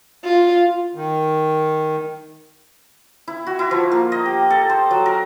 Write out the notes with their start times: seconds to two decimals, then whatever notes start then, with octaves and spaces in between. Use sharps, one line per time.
0.25 F4
0.95 D#3
3.27 E4
3.47 F#4
3.59 E4
3.71 F3
3.92 A#3
4.12 D#5
4.26 G4
4.50 A4
4.70 C5
4.91 F#3
5.06 A#4